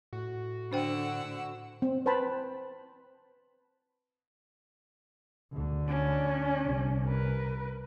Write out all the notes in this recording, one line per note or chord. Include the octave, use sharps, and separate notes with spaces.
A2 F#4
D3 D4 C5 F#5 G5 E6
C4
B4 C5 G5 A5 B5
D2 D3
C#4 D4
C2 C3
A#4 B4